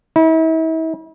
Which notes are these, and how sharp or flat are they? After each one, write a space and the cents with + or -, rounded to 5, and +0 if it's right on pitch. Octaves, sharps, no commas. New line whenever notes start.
E4 -40